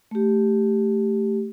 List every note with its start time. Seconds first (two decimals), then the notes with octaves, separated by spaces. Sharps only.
0.11 A3 G4